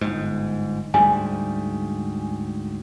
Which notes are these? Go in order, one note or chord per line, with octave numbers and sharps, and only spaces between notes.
G1 G#2
D2 G#2 G3 G#5